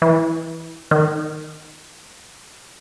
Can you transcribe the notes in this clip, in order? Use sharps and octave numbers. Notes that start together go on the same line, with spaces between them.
E3
D#3